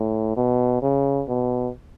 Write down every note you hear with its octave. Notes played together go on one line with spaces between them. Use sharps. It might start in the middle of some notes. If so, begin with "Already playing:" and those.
Already playing: A2
B2
C#3
B2